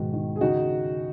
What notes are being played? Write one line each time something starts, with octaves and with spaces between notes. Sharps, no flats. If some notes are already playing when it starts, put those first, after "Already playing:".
Already playing: G#2 B2 D#3 F#4
D#3
G#4
C#3 D#4 F#4